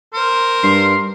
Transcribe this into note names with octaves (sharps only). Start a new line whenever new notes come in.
A#4 C5
G2 C6